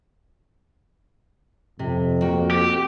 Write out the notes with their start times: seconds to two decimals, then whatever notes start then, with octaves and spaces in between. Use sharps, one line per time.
1.79 F2 C3
2.22 A#3 F#4 G5
2.51 G4